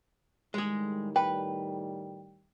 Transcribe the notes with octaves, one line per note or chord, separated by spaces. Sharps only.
A2 D#3 G3 G#3 G#4
B4 G5